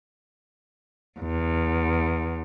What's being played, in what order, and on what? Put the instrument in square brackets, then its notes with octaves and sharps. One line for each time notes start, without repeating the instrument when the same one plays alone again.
[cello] E2